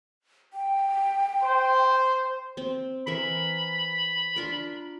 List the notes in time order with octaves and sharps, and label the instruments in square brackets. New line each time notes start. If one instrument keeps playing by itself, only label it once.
[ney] G5
[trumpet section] C5
[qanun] C4
[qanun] E3 A#4 E5 [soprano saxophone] B5
[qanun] D4 F4 A#4